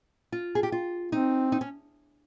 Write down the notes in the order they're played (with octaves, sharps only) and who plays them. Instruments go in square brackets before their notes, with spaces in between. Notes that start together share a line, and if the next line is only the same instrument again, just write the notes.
[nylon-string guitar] F4
G#4
G4
F4
[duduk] C4 [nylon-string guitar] D#4
[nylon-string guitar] D#4
C#4